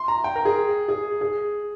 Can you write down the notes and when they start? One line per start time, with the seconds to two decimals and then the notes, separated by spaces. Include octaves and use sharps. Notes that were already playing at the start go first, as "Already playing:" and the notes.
Already playing: C6
0.08 A#5
0.24 G5
0.36 A#4
0.45 G#4
0.89 G#4
1.21 G#4